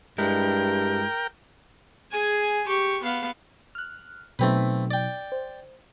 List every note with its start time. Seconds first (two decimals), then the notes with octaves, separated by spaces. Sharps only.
0.18 G2 G#3 E4 A#4 G5
2.11 G#4 G#5
2.67 G4 C#6
3.03 B3 F5
3.75 F6 F#6
4.39 B2 F#3 A3 C4 D#4 B4
4.91 D5 G5
5.32 C5